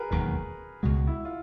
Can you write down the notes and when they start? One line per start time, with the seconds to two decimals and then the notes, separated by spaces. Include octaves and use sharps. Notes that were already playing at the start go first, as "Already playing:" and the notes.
Already playing: F#4 G#4 A#4 B4
0.10 E1 D#2 D#3 F#3 A#4
0.83 C#2 B2 G#3 F#4
1.07 E4
1.25 F4